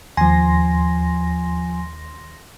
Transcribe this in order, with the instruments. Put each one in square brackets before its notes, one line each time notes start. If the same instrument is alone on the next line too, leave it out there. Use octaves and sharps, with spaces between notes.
[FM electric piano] D#2 C6 A#6 [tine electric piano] F3 G#5